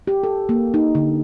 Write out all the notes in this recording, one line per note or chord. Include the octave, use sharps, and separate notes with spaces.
G4
A4
A#3
D#4
D3